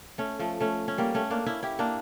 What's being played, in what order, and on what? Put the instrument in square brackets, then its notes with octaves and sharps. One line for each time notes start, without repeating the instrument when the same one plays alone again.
[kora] A3 C#4
F3 A3
A3 C#4
C#4
G3 A#3
A3 C#4
A#3 D4
C#4 E4
E4 G4
A#3 D4